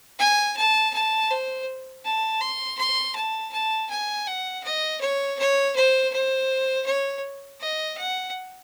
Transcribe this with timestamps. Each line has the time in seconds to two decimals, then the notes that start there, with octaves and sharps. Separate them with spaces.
0.19 G#5
0.57 A5
0.94 A5
1.31 C5
2.05 A5
2.41 C6
2.78 C6
3.15 A5
3.53 A5
3.90 G#5
4.27 F#5
4.64 D#5
5.01 C#5
5.39 C#5
5.76 C5
6.13 C5
6.86 C#5
7.60 D#5
7.98 F#5